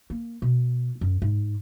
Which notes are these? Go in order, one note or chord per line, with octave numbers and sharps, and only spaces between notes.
A#3
B2
F#2
G#2